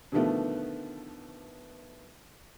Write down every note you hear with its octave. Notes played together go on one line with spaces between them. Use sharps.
B2 D3 D#3 F3 A3 B3